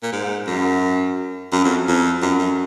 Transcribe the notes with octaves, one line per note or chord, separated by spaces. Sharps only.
A#2
G#2
F#2
F#2
F2
F2
F#2
F#2